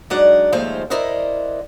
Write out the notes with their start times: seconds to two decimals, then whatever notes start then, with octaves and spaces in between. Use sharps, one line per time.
0.10 F#3 G#3 D4 D#4 D5 F#5
0.53 D#2 F3 G#3 A3 C5 F5
0.90 E4 A#4 C5 D5 D#5 F#5